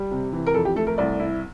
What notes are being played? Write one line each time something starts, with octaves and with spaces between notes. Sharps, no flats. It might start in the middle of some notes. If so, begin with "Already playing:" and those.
Already playing: G3
C3
E3
A#4
F2 A4
G4
A3 A4
A#4
C2 D5
E4